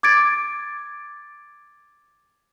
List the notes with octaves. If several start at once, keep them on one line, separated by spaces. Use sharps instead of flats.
D6 G#6 A6 D7